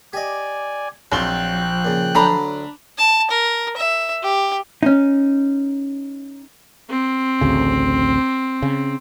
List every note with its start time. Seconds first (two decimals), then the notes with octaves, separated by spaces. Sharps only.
0.13 G4 D5 D#5 G#5
1.12 A#1 F3 F#3 C4 F4 G5 F#6 G7
1.85 A#2 C#3
2.15 D2 D3 F#3 D4 A#5 B5
2.98 A5
3.31 A#4
3.77 E5
4.23 G4
4.83 C#4 D#4
6.89 C4
7.41 A1 D2 C#3
8.62 C#3